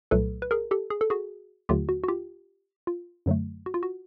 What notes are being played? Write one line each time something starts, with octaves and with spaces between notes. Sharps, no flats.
C2 A#2 F#3 A3 A4 B4
B4
G#4 A#4
G4 A4
G#4
A4
F#4 G#4
D#2 D3 F#3 A3 F4 G4
F#4
F#4
F4 G4
F4
F#2 D3 F#3 A3
F#4
F4
F#4